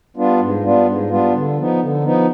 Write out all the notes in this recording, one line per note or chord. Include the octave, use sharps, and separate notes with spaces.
G3 B3 D4 F4
G#2
G3 B3 D4 F4
G#2
G3 B3 D4 F4
D3
F3 B3 D#4
D3
F3 B3 D#4